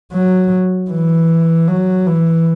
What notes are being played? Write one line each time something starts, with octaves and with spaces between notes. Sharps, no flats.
F#3
E3
F#3
E3